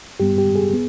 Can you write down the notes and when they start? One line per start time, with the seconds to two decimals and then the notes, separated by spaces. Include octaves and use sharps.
0.20 G2 G3 B3 G4
0.38 G4
0.56 G#4
0.73 B3